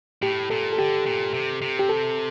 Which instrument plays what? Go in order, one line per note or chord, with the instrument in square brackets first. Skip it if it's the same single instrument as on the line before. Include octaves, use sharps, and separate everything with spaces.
[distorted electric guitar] A2 [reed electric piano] G4
[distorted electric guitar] A#2 [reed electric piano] A4
[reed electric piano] A4
[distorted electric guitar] D3 [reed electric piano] G4
[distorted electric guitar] A#2
C3
C3
[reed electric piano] G4
A4